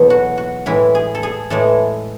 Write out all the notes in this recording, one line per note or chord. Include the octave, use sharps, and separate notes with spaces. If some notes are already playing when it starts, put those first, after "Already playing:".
Already playing: E2 B2 F#3 A4
F#4
F#4
A2 E3 G#3 E4
G#4
A4
G#4
A2 E3 G#3 A4